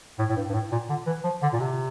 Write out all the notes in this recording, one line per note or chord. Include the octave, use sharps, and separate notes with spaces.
A2
A2
G2
G2
A2
A#2
D3
E3
F3
D3
A#2
C3